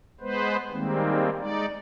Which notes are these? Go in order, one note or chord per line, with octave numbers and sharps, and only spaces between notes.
G#3 B3 B4 C5
D#3 G3 G#3 A#3 C4
G#3 D#4 D5